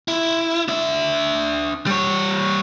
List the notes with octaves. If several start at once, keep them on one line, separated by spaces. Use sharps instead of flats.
E4
D4 E5
G3 C#5